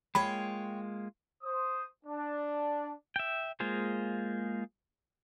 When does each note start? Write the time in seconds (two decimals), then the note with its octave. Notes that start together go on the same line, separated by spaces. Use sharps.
0.15 G#3 A#3 F4 C#5 G5 B5
1.43 C5 D#6
2.05 D4
3.16 E5 G5
3.60 G#3 A#3 F4 G#4 C5